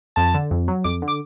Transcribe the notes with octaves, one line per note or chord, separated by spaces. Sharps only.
F2 A5
D3
F2
F#3
F2 D6
D3
D6